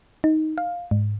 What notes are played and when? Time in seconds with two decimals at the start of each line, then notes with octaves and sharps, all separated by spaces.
0.24 D#4
0.58 F5
0.91 G#2